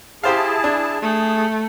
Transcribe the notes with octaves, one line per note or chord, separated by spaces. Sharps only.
E4 G4 G#4 C5 F5 A5
D4
A3 G#4